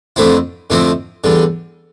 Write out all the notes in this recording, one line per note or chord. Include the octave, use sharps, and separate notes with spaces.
F2 D3 A3 C4 E4
F2 D3 A3 C4 E4
E2 D3 G3